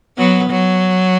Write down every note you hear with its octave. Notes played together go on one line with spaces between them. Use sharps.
F#3 B3
F#3